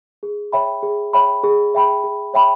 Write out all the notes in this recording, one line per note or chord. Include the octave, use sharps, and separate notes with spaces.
G#4
C#5 E5 G5 B5
G#4
C#5 E5 G5 B5
G#4
C#5 E5 G5 B5
G#4
C#5 E5 G5 B5